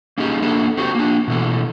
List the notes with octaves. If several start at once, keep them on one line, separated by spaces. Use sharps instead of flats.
A#3 C#4 D#4 G4 G#4
A3 A#3 D4 A4
C4 F#4 G4
A#3 D4
B2 E3 A3